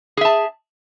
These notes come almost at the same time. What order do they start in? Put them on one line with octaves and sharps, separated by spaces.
G#4 E5 A5